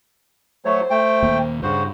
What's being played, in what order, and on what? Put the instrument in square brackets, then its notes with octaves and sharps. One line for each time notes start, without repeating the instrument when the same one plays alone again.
[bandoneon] F#3 A3 C#5 [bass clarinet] C5
[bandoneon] A3 G5
[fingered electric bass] D#2 A#2
[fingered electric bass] G2 [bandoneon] C#3 F#4 C5